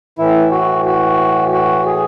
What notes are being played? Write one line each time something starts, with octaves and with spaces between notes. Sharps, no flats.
A2 E3 E4
F#4
F#4
F#4
G#4